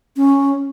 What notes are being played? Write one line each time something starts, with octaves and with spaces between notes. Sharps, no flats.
C#4